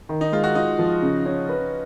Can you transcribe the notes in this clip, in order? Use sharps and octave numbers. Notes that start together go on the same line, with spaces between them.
D#3
D#4
G#3 F4
F#4
D#4 F4
F3
C#3
C#4
B4